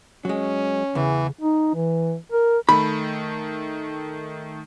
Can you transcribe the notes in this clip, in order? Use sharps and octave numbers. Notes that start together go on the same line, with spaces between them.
F#3 G#3 C#4
E2 C#3 E3
D#4
E3
A#4
D#3 A3 B5